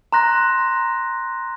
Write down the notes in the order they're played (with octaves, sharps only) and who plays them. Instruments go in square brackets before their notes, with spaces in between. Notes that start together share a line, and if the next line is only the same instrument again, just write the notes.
[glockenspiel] A#5 C6 F#6 A#6